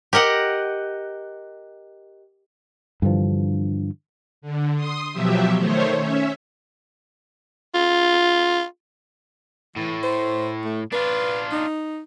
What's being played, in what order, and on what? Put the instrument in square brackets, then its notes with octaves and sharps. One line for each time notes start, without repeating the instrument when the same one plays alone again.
[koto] G4 A#4 D#5 F#5
[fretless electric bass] G2 D3 E3 F3
[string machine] D3
C6 D#6
B2 F3 F#3 G4 E5
D#3 A3 C5 C#5
C#4 E5
[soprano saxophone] F4
[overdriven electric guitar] A2 [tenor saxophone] E3
[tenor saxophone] C5
A3
[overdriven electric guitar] D4 F4 [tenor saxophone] B4
[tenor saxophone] D#4